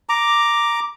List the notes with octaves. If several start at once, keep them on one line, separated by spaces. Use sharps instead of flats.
A#5 D6